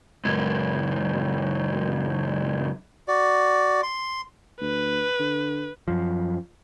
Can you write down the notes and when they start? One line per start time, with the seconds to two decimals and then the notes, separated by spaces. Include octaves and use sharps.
0.25 C#2 F#2
3.08 F#4 D5
3.83 C6
4.61 D2 B4
5.19 D3
5.88 F#2 F3